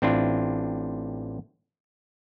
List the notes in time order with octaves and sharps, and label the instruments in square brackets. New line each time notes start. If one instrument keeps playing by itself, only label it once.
[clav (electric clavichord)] A1 C4 D4 E4 F4